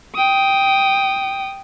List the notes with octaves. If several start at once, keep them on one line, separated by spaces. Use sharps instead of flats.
G5 D#6